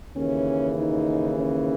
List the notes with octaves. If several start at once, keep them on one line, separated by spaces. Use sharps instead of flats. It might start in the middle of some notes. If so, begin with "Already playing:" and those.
D#2 C#3 E3 C#4
D#4
C#4